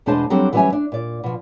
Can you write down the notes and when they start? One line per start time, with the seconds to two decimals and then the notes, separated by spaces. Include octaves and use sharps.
0.06 E2 B2 G#3 D4 C5 A5
0.30 F#3 G3 C4 D4 G4 A4
0.53 E3 F#3 G3 C#4 E5 G#5
0.73 D4
0.92 A#2 D5
1.24 B2 F3